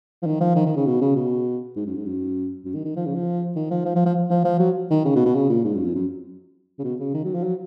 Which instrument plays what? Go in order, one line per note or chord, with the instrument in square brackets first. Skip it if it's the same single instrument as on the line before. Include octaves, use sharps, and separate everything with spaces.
[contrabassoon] F3
D#3
F3
D#3
D#3
C#3
B2
C#3
B2
G#2
F#2
G#2
F#2
F#2
D#3
D#3
F3
C#3
F3
D#3
F3
F3
F3
F3
F3
F3
F#3
D#3
C#3
B2
B2
C#3
A#2
G#2
F#2
F2
F#2
C#3
B2
C#3
D#3
F#3
F3
F#3